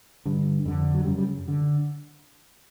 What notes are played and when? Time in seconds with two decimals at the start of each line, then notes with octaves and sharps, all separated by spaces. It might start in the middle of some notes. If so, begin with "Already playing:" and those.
0.25 G2 D3
0.65 F2 D3
0.94 F#3
1.04 F#2 C#3 G3
1.18 G3
1.48 D3